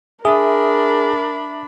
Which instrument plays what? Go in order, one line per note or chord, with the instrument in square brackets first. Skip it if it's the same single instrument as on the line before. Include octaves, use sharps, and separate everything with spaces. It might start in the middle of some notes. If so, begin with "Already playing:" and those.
[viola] D4 B5 [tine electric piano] G#4 [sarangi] A#4 [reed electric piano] E5 D#6